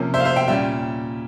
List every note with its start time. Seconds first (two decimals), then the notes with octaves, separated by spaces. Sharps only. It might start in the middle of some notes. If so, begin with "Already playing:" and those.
Already playing: C3 F3 A#3 C#4
0.14 C5 E5
0.20 F5
0.25 C5 E5
0.36 E5 G5
0.48 A#2 G3 C#4 E5 G5